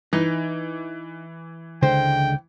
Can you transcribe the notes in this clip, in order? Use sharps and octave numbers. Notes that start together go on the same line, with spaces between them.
E3 D#4
C#2 D3 G#3 C5 G5